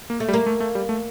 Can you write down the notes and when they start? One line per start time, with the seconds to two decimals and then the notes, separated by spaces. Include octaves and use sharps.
0.10 A#3
0.20 A3
0.28 G3
0.33 A#3
0.46 A3
0.60 A3
0.75 G3
0.89 A3